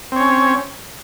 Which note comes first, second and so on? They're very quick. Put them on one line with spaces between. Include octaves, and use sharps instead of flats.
C4 C#5 C#4